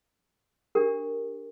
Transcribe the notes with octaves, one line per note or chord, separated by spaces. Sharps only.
D4 G4 A#4